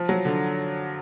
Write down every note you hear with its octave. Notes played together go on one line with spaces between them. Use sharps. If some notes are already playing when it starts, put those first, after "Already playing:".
Already playing: F3
F#3
D3